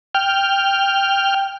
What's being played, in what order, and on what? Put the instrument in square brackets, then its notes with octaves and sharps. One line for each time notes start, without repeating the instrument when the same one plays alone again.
[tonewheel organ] G5 F6